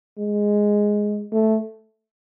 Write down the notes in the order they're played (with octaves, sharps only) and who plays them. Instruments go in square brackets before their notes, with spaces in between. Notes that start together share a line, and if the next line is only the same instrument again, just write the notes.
[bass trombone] G#3
A3